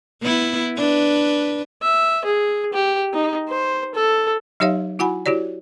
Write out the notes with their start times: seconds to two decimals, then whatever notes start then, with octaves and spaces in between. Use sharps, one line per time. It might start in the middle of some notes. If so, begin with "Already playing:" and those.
0.22 B3 E4
0.77 D4 B4
1.82 E5
2.24 G#4
2.73 G4
3.13 D#4
3.48 C5
3.95 A4
4.60 F#3 D#4 G4 C#5 E5 F5
4.99 E4 F#4 F#5 G#5 B5
5.26 E4 F#4 G4 C#5 D5